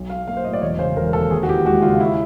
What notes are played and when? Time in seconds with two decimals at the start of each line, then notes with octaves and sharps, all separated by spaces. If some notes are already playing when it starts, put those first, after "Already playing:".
Already playing: B1
0.10 F#3 F5
0.28 A#3 F5
0.37 C5
0.45 A2 D#5
0.53 D5
0.62 E1 C#5
0.79 C#3 C5
0.96 E1 A#4
1.13 D#2 A4
1.31 D#2 G#4
1.43 F#4
1.49 E3 G4
1.65 G#3 F#4
1.82 C#3 F4
2.00 E4